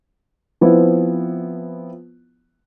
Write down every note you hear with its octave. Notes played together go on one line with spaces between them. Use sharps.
F3 B3 C4 E4